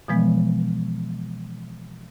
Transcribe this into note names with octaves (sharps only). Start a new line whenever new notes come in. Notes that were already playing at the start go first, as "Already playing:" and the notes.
B2 E3 F3 G#3 B3